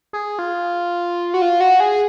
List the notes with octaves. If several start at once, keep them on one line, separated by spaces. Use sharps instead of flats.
G#4
F4
F#4
F4
F#4
G#4